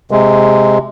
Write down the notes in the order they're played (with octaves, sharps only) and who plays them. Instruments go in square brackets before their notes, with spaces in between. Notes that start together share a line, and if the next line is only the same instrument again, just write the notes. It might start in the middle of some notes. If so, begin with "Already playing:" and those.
[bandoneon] C3 G#3